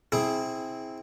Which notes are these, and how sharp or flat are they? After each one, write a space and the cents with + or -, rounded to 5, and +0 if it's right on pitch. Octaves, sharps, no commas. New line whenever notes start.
C4 +0 E4 -20 G#4 +5